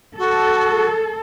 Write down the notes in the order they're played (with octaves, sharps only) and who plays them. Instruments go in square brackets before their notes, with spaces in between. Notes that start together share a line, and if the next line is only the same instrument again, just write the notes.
[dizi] F#4 [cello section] A4